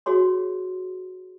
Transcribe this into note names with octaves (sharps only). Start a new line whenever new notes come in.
F#4 G#4 C#5 C6